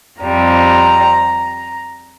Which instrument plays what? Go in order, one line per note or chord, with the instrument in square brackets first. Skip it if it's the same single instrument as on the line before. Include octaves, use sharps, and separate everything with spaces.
[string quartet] F2 C3 G3 A#5